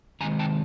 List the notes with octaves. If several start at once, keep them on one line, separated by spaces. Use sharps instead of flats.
E2 C3 D#3 G#3 G#5 A#5
G5 A5